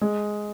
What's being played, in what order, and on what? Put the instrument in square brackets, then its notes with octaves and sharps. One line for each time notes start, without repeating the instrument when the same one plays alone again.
[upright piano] G#3